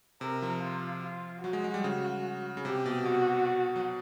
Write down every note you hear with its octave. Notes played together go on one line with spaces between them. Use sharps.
C3 A#4
F3
F4
F4
F#3 F#4
G#3
G#3
G3
C#3
C#3
C3 G4
B2
B2 F#4
F#3